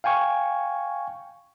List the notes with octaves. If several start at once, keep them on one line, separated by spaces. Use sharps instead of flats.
F5 G5 G#5 C#6